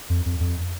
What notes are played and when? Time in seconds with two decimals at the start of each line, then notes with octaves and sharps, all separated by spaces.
0.10 F2
0.26 F2
0.40 F2